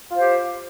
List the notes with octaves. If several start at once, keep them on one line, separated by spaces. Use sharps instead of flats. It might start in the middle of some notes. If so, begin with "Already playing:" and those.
F4 G4 C5